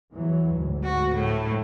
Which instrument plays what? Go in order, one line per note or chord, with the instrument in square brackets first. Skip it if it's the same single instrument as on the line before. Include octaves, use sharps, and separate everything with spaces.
[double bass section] E2 E3 F#3
D2 G#2
[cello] F#4
A2 A3